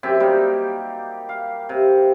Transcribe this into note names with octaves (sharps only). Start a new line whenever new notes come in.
F#2 C3 G4 E5
G3 A#3 D#4
F5
C3